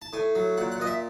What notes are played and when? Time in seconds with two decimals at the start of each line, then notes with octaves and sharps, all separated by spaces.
0.02 A5
0.13 A2 G#5
0.35 F#3
0.57 A#2 F#5
0.72 F#5
0.80 A#2 D#5
0.87 E5